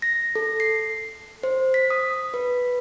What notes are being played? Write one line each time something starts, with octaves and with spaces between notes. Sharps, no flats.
A#6
A4
C7
C5
B6
D#6
B4